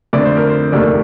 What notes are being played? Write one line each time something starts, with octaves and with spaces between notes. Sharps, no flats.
F2 D3 A3 D5
C5
A#4
C5
F1 D#2 D#3 A3 D5